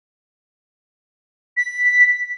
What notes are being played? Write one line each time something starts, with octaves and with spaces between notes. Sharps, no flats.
B6